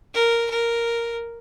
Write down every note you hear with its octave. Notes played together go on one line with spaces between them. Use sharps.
A#4
A#4